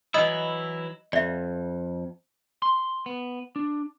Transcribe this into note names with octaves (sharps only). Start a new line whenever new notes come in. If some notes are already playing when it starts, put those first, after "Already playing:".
E3 F#3 E4 D#5 D#6
F2 D5 E5
C6
B3
D4